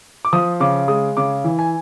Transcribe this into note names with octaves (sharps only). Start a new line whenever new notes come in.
D6
F3 D#6
C#3 D6
G#3 D#6
C#3 D6
E3
G#5